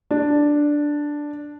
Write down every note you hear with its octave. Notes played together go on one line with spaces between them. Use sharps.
D4